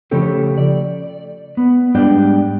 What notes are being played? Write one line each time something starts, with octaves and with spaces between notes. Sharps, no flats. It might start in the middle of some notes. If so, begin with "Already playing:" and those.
C#3 F3 A3 C#4 G4 A4
D5
B3
G#2 G3 D4 G4 D5 G5